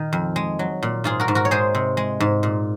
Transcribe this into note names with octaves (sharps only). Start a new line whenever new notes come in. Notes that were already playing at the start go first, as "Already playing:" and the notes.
Already playing: A#2 D#3
F2
G#3
F#3
A#2
G#2 F4 G#4
F#4 A#4
G#2
F#4 A#4
C#5
G#3 G#4 C5
C3
G#3
G#2
A#2